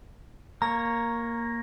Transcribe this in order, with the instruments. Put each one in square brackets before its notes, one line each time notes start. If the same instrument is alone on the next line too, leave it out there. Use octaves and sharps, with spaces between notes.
[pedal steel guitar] A#3 C#5 [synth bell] A#5